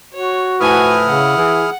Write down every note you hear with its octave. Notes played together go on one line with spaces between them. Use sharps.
F#4 C#5
A2 F3 E4 B4 F#5 G#5 D#6 F6
C#3 F#5
E3 G#4